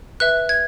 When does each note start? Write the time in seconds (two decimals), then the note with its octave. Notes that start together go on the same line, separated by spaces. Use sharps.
0.20 B4 E5 F#6
0.49 G#6